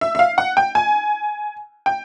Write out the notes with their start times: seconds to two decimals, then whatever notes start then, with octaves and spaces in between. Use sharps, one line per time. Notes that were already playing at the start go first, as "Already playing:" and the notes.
0.01 E5
0.15 E5
0.19 F5
0.38 F#5
0.57 G5
0.75 G#5
1.86 G5